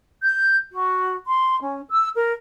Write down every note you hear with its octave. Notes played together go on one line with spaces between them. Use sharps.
G6
F#4
C6
C#4
E6
A#4